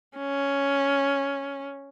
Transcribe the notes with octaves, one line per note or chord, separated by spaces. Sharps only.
C#4